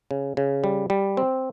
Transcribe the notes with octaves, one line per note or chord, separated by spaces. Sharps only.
C#3
C#3
G3
G3
C4